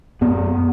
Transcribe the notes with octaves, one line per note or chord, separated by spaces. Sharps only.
F#2 B3